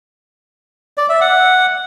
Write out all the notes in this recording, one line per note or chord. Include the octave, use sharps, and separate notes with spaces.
D5
E5
F#5